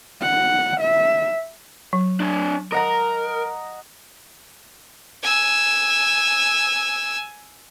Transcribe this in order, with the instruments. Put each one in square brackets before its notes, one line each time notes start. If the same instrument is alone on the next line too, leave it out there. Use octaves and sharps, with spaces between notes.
[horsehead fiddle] F#5
E5
[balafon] F#3
[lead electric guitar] D4 C#5
[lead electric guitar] A#4 [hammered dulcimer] D#5 F#5 A#5
[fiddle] G#5 E6